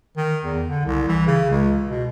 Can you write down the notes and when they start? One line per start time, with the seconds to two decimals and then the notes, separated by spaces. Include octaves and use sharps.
0.17 D#3
0.44 E2
0.69 D3
0.85 C2
1.09 E3
1.27 C#3
1.51 C#2
1.88 B2